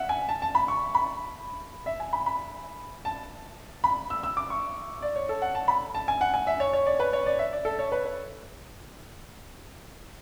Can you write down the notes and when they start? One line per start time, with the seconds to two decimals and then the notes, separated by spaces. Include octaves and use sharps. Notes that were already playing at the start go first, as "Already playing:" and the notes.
Already playing: E5 F#5
0.09 G#5
0.29 A5
0.42 A5
0.55 B5
0.68 C#6
0.95 B5
1.86 E5
2.00 G#5
2.13 B5
2.26 B5
3.05 A5
3.84 B5
4.10 E6
4.23 E6
4.37 D6
4.50 C#6
5.02 D5
5.16 C#5
5.29 A4
5.42 F#5
5.55 A5
5.68 B5
5.95 A5
6.08 G#5
6.21 F#5
6.34 G#5
6.47 E5
6.60 C#5
6.73 C#5
6.86 D5
7.00 B4
7.13 C#5
7.26 D5
7.39 E5
7.52 D5
7.65 A4
7.79 C#5
7.92 B4
8.05 B4